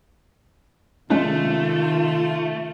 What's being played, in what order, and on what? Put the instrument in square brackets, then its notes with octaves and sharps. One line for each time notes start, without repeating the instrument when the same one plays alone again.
[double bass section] C3 D#3 [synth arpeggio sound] G#3 C#4 D4 [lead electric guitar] A3 [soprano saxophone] F4